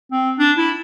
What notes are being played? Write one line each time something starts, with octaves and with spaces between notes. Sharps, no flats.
C4
D4
E4